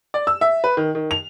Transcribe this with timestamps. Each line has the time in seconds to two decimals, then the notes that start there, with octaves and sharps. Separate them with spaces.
0.14 D5
0.27 E6
0.41 E5
0.64 B4
0.77 D#3
0.95 D#3
1.11 F7